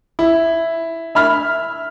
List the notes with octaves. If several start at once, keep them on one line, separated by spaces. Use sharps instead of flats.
E4
E5 B5 F6